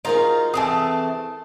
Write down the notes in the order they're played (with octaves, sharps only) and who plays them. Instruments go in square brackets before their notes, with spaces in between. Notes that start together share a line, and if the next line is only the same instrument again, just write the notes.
[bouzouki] D#4 F4 F#4 [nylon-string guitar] G#4 A#4 C5
[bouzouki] E3 A3 C4 [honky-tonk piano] A5 D#6